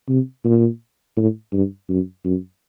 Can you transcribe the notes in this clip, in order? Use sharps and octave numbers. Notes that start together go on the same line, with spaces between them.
C3
A#2
A2
G2
F#2
F#2